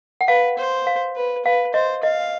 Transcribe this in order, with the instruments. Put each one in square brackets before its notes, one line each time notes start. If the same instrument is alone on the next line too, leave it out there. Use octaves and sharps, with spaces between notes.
[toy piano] F#5
[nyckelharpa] B4 [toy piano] F5
[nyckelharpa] C5
[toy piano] F5
[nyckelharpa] B4
[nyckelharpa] B4 [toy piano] F5
[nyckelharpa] C5 [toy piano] D#5
[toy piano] D#5 [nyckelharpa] F5